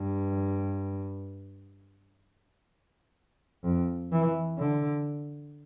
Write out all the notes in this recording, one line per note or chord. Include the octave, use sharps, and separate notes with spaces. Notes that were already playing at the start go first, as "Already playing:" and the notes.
Already playing: G2
F2
E3
D3